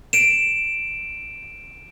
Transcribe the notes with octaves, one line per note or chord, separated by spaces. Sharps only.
D7 E7